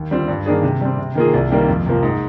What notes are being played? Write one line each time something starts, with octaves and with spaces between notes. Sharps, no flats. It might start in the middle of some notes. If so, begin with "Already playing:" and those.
Already playing: D#2
D3 G3 C4 F4
G2
D#3 A#3 D4 G#4
C3
G3 C4
C3
D#3 A#3 F4 G#4
C2
C3 D#3 G3 A#3
F2
C3 F3 A#3
G#2